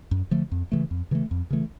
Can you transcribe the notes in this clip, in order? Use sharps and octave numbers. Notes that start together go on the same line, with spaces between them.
F#2
D3 F3 A3
F2
C#3 E3 A3
F2
C#3 E3 A3
F2
C#3 E3 A3